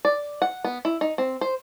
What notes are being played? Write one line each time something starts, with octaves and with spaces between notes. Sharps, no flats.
D5
F#5
B3
E4
D#4
C4
C5